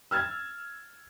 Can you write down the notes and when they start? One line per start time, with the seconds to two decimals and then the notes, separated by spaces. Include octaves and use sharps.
0.11 E6 F6 G#6 A6